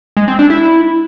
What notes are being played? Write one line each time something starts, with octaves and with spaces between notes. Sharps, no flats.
G#3
C4
D4
E4